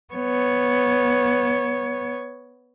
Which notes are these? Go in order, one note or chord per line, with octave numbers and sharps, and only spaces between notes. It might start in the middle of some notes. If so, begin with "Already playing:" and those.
B3 C#5